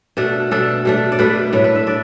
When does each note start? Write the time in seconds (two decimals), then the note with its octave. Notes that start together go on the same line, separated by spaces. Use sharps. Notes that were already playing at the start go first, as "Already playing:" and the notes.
0.17 B2 A3 D4 F#4
0.51 B2 A3 D4 A4
0.85 B2 A3 D4
1.12 D5
1.19 B2 A3 D4 B4
1.53 A2 A3 D4 B4
1.64 B4
1.75 E5
1.86 D4 D5